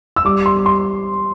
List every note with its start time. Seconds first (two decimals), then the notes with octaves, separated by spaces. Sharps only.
0.16 E6
0.25 G3 D6
0.46 C6
0.56 G3
0.66 C6